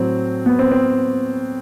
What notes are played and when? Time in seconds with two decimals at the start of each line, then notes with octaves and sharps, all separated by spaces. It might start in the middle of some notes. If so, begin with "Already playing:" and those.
Already playing: A2 F#3 C4
0.46 B3
0.59 C4
0.72 C4